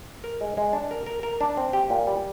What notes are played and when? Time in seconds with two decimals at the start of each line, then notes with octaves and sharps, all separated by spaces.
0.24 A#4
0.41 G#3
0.57 G#3
0.73 D4
0.91 A#4
1.06 A#4
1.23 A#4
1.41 D4
1.57 C4
1.73 G4
1.90 A#2
2.07 G3